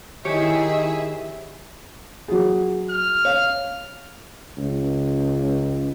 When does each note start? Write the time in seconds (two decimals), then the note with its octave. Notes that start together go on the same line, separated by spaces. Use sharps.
0.25 D#3 E4 G4 G#4 C#5 E5
2.28 F#3 G#4
2.91 F6
3.25 C#5 F5
4.58 C#2